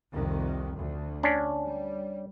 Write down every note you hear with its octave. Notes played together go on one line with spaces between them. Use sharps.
C2 F2 D#3
D2
C#4 D4
G3